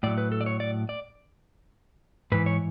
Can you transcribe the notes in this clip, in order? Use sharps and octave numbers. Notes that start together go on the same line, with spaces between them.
A2 F#3 D5
B4
A4
D5
C#5
D5
D5
G#2 E3 B4
C#5